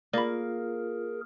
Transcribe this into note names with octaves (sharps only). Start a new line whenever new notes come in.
A#3 F4 G#4 A#4 D5 B5